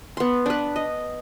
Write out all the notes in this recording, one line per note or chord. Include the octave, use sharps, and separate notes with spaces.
B3 C6
D4 B4
D#5